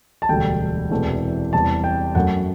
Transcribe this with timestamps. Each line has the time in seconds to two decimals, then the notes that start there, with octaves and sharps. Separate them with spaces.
0.22 A5
0.29 E1 D2 D3 G3 G5
0.91 E1 E2 C3 E3 A3
1.53 E2 C3 G3 A5
1.84 G5
2.15 F#2 F#3 A3 F#5